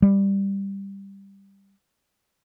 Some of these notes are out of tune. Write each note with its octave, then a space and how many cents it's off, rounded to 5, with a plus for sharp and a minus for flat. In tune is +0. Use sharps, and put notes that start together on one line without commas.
G3 +5